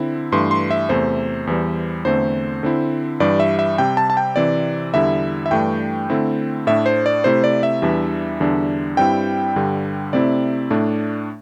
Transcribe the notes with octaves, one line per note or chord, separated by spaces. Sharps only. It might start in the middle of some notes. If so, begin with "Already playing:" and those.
Already playing: D3 C4 E4
G2 E3 A3 C6
C6
E5
E2 C3 A3 C5
E2 E3 G3
E2 D3 A3 C4 C5
D3 C4 E4
G2 E3 G3 D5
E5
E5
C3 G3 C4 G5
A5
A5
G5
C3 E3 C4 D5
E2 D3 G3 E4 E5
E5
G2 E3 A3 D4 G5
D3 A3 C4 E4
A2 A3 D4 E5
C5
D5
C3 A3 E4 C5
D5
E5
E2 E3 G3 D4
E2 D3 G3 D4
G2 G3 C4 E4 G5
G2 D3 G3
C3 A3 C4 E4 D5
A2 A3 D4